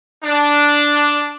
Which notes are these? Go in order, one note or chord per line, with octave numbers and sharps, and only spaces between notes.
D4